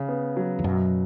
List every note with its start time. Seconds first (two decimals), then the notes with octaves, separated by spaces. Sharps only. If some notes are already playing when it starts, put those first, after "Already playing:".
Already playing: C#3
0.09 B3
0.37 F#3
0.59 E2
0.64 F#2 B2